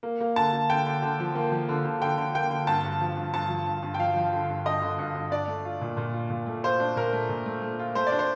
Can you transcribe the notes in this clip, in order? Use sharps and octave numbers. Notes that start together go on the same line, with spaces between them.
A#3
A#3
D3 A5
D3
D3 G5
D3
D3
F3
A#3
F3
D3
D3
D3 G5
D3
A#3 G5
D3
G2 A5
G2
F3
G2
G2 A5
F3
G2
G2
G5
F3 F5
F3
D3
G2
G2 D#5
D3
G2
G2
D4 D5
A3
F4
A#2
A#2
F4
A#2
A3
F4 C5
D4
A#2 A#4
A3
A#2
A3
A3
F4
A3 C5
D5
D4
C5